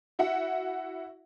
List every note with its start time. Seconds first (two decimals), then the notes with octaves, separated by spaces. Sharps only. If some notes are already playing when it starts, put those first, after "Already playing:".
0.19 E4 F#4 E5 F#5